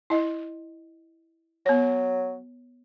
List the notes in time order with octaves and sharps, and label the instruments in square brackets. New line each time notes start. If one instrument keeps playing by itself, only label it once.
[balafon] E4 D#5
[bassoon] F#3 [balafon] B3 C#5